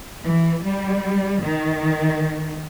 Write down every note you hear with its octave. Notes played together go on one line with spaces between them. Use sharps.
E3
G3
D#3